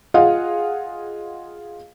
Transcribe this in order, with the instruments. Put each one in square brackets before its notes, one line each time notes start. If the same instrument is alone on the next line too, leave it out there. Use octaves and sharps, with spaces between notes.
[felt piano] F4 G#4 D#5 F5 F#5